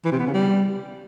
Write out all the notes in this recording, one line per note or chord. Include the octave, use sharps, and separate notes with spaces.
E3
C3
B3
C#3
G3